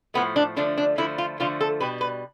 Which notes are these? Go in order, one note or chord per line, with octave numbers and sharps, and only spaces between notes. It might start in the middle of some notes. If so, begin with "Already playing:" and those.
A2 F3 A3 B3
D4
D3 F3 A3 D4
D4
D3 F3 A3 E4
F4
D3 F3 A3 F4
A4
B2 G3 B4
B4